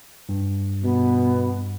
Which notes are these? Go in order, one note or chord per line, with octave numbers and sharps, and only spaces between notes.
G2
B2 B3